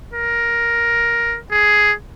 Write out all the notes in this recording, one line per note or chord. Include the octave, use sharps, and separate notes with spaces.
A#4
G#4